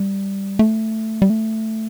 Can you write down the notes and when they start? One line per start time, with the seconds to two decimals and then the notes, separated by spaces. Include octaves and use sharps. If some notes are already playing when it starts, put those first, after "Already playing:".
Already playing: G3
0.59 A3
1.22 G3
1.30 A3